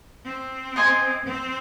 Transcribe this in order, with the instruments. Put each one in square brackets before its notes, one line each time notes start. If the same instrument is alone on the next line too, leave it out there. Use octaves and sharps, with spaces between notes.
[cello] C4
[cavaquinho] C5 D#5 G#5 C6
[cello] C4